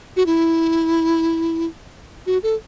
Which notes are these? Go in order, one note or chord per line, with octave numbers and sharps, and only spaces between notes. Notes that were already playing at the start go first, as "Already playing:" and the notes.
F#4
E4
F#4
A4